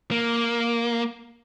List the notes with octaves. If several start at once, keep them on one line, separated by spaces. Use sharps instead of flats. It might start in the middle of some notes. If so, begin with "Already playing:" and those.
A#3